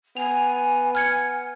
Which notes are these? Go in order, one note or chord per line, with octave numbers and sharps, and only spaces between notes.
B3 G#5 F7
F6 G#6 C#7